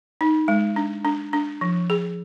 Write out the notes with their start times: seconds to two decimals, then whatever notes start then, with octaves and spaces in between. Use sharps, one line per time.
0.21 D#4
0.48 G#3
0.76 D4
1.05 D4
1.33 D4
1.61 F3
1.90 G#4